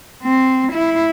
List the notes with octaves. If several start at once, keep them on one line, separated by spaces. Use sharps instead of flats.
C4
E4